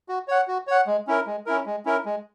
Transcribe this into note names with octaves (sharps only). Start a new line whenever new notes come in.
F#4
C#5 F#5
F#4
C#5 F#5
G#3
C#4 E4 A#4
G#3
C#4 E4 A#4
G#3
C#4 E4 A#4
G#3